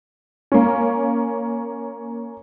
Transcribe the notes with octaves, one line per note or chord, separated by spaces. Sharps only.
A#3 C#4